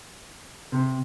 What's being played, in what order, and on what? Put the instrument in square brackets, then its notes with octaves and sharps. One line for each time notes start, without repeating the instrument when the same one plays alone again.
[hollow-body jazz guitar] C3